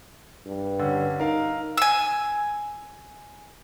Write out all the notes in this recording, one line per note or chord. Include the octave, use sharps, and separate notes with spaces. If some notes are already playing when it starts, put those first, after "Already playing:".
G2
D3 C#4
D#4 A#4 F5
G#5 E6